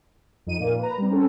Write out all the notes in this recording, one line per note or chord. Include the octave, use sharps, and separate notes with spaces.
F2 D#4 D#7
A#2 A#3
B4 A#5
G3 C4
C4 C#4 A4